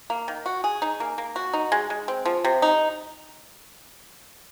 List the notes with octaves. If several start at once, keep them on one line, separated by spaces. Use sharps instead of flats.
A#3
D#3
F#4
G#4
D#4
A#3
A#3
F#4
D#4
G#3
G#3
C4
F3
C3
D#4